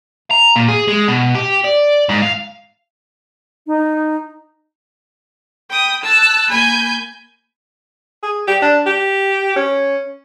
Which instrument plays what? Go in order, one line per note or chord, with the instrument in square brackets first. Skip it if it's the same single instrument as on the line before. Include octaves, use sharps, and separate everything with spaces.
[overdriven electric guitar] A#5
A#2
G#4
G#3
B2
G4
D5
G#2
F5
[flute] D#4
[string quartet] G5 B5 D#6
A5 E6 F#6
A#3 G#5 B5 G6
[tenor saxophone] G#4
G4
D4
G4
C#4